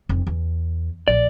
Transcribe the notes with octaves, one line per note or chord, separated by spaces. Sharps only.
F1
E2
A#1 D5